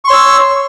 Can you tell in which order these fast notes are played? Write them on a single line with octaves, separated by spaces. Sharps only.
C#6 C6 C#5 E6